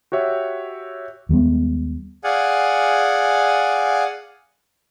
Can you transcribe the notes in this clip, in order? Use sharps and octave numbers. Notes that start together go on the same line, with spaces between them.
F#4 G4 C#5 E5
D#2 G3 G#3 B3
G#4 D5 F5 F#5 G#5